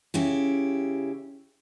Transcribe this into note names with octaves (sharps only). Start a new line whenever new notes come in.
C#3 E4 G4